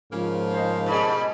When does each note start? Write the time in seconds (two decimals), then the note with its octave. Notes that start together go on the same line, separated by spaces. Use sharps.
0.13 G#2 C#3 F3 A#3
0.53 C5 D#5
0.86 B2 G3 G#4 B5